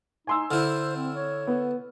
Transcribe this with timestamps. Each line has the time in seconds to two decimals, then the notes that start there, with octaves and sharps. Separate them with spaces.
0.27 D#4 G#5 C6 E6
0.51 D3 E4 C5 F6
0.96 C4
1.15 C#5
1.47 B3